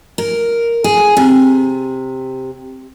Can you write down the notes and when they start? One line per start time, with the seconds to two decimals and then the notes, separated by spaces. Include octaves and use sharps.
0.18 A#4
0.84 G#4
1.17 C3